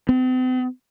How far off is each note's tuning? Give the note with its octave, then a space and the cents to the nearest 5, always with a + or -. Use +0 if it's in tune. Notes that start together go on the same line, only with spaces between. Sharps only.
C4 -45